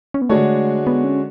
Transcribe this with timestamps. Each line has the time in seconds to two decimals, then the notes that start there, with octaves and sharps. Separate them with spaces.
0.14 C#4
0.22 B3
0.29 D3 G#3 A3 D4 F#4 C#5
0.87 B3
1.04 C#4